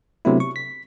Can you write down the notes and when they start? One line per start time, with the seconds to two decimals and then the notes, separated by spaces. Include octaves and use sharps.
0.25 C3 F#3 A3 B3 D4 E4
0.40 C#6
0.56 B6